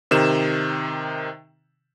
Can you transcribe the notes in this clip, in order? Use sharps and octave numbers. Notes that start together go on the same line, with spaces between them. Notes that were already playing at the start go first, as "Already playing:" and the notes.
C3 D#3 E7